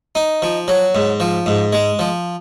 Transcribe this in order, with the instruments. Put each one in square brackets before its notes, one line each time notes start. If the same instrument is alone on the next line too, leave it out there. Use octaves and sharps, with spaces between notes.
[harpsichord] D#4
F3
F#3
G#2
F3
G#2
G#3
F3